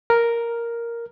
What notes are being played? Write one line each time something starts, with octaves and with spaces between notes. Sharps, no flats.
A#4